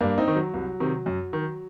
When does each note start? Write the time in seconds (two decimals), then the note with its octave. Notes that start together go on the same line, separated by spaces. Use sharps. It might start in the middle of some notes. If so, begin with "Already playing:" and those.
0.01 G2 A#3 D4
0.18 C4 D#4
0.28 D#3
0.36 F#3
0.54 C2
0.80 C3 D#3
1.06 F#2
1.33 D#3